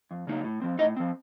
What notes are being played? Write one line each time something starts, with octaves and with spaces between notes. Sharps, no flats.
F2
C#3 F#3 A#3 D#4
A2
F3 C4
A2 D#4 D#5
F3 C4